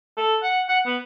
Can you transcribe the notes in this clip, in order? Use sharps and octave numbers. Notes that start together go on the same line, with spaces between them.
A4
F#5
F#5
B3